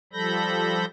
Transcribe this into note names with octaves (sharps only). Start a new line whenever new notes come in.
F3 G3 A4 B5 G6 A#6